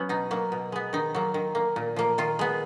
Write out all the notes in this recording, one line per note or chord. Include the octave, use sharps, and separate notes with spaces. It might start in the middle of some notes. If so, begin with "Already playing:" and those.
Already playing: F#3 B3 C#4
B2 D#4
F#3 A#3
B2
G#3 B3
D#3 D#4
F#3 A#3
D#3
A#3
A#2
F3 A#3
D#3 F4
G#3 B3